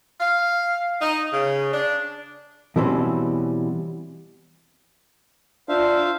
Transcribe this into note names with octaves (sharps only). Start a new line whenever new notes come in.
F5
D#4
C#3
D4
B2 E3 G3 C4 C#4 B5
D4 F4 C5 E5 F5